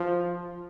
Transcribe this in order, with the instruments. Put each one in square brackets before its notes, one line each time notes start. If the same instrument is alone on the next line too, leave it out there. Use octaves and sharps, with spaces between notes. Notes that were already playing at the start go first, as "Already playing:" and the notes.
Already playing: [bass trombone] F3